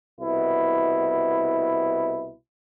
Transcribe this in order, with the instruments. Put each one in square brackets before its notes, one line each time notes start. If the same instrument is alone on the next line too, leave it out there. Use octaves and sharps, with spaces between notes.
[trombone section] C2 B2 E4